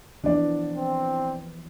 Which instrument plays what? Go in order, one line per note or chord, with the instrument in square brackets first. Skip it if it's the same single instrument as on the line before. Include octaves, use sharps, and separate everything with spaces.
[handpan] E3 F3 B3 [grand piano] D4 D5
[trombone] C4